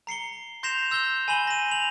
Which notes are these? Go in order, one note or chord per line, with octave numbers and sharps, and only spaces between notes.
A#5 C7 C#7 G7
C6 G6 A#6 C7 E7 F7
C6 E6 G6 A#6 G7
G#5 B5 E7 F#7 G7
A#6 D#7
F7 F#7